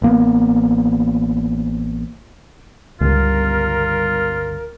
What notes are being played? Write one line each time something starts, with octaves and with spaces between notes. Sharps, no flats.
A1 A#3 B3
G1 C#2 G3 F4 A#4